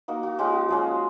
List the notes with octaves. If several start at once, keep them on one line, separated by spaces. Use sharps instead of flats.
A#3 D#4 F#4
F#4
G#3 C#4 F4 F#4
F3 G#3 C#4